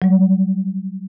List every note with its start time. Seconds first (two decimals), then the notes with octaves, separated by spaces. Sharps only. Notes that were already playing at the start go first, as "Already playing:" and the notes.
0.02 F#3 G3